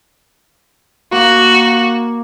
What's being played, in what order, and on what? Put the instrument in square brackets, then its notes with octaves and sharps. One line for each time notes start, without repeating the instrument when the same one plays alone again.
[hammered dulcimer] A#3 [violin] F#4